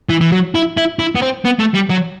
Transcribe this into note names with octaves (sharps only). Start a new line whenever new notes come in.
E3
E3
F#3
E4
E4
E4
B3
C4
B3
A3
G3
F#3